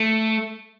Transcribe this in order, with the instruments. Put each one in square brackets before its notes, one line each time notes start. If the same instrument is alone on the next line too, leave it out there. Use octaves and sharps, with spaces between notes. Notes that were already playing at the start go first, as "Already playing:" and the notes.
Already playing: [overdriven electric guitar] A3